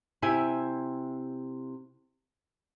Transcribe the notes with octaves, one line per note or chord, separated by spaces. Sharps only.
C3 E4 G4 E5 G#5